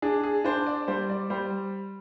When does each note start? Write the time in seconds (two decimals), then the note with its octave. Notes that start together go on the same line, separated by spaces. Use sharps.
0.02 D4 G#4
0.23 G#4
0.44 D4 C5
0.66 D5
0.88 G3 C5
1.09 D5
1.30 G3 C5